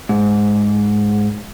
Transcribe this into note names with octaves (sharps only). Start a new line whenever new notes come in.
G#2